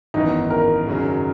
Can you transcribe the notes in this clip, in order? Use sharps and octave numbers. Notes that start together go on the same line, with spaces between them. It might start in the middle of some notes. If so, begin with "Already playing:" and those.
G#1 F#2 E3 B3 D#4
A#4
G#1 F#2 C#3 F#3